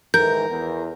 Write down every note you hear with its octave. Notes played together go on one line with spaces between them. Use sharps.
G#2 D#3 E3 A#4 G6
E2